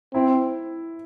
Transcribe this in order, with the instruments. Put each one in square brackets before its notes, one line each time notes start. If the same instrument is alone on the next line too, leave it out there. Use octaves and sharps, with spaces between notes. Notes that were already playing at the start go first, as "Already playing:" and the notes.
[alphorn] C4 [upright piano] E4